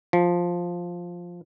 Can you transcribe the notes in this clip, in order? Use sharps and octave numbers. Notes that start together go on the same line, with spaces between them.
F3